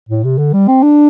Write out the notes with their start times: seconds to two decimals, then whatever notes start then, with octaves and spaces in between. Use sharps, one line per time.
0.09 A2
0.24 C3
0.38 D3
0.53 G3
0.68 C4
0.83 D4